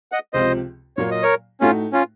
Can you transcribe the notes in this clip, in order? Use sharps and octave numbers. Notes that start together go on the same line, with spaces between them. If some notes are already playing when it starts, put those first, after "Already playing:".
D#5 F#5
C#2 C3 F3 C4 F4 C5 D#5
A#2 F#3 A#3 C#5
D#5
A#4 C#5
A2 A3 C#4 D#4 F4 F#4
C#4 F4